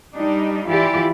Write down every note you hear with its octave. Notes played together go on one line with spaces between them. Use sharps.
G3 D4 D#4
E3 E4 F4 G4 D5